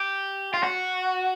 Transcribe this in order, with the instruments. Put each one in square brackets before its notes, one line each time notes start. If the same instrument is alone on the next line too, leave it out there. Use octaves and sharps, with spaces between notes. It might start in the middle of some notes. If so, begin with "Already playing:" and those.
Already playing: [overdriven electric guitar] G4
F4
F#4